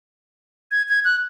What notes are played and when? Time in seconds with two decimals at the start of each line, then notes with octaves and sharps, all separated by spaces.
0.71 G#6
0.89 G#6
1.05 F#6